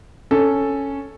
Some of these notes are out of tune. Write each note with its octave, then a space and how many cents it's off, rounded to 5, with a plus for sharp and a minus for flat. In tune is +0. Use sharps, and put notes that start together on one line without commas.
C#4 +0 A4 +0